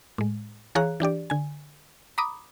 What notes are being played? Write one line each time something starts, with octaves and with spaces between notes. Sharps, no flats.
A2 G#3
E3 G#4 C#5 F5 A#5 F#6
E3 D4 G4 D5
D3 G#5
A#5 B5 D6 D#6